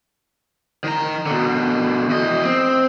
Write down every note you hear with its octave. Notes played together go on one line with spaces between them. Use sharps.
D#3 A#5
B2 D3
E2 D#5
C4